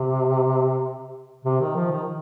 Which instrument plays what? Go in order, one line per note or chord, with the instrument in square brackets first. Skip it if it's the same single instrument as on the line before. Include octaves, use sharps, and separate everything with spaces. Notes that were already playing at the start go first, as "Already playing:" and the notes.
Already playing: [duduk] C3
C3
D#3
F3
D#3